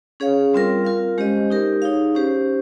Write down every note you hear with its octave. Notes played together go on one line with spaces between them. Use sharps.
C#4 G#4 C#5 F5
G3 C4 F4 A#4
F4 A#4 F5
G#3 C#4 G4 C5 D#5
D#4 G4 A#4
D#4 G#4 C#5 F5
C#4 G4 C5